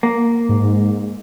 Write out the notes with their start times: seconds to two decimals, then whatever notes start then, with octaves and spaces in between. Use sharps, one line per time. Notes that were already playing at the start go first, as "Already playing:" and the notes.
0.03 A#3
0.49 G#2